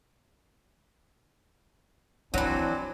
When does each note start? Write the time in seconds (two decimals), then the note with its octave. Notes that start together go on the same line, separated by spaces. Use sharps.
2.34 E3 F#3 C4 D4 E4